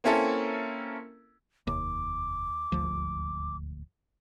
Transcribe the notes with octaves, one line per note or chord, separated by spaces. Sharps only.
A#3 C4 C#4 E4 A4 A#4
F1 D#2 D6
D#1 G#1 D2 F3